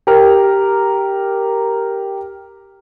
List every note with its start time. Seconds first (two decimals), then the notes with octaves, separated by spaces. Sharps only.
0.07 G4 A#4